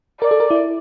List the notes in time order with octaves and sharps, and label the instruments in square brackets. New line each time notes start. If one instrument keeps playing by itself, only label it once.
[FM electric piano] A#4 [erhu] D5
[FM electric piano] A4
A#4
E4